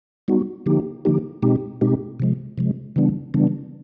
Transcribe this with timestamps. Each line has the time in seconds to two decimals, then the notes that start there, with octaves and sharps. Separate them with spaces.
0.28 G3 B3 D#4 F#4
0.66 D3 F3 A#3 D#4 G4
1.05 D3 F3 A#3 D#4 G4
1.42 B2 G#3 C4 D#4 G4
1.81 B2 G#3 C4 D#4 G4
2.20 C3 F3 G#3
2.58 C3 F3 G#3
2.96 C#3 E3 G3 B3 D4
3.34 C#3 E3 G3 B3 D4